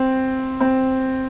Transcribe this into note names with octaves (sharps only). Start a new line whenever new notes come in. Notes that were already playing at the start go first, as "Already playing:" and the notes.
Already playing: C4
C4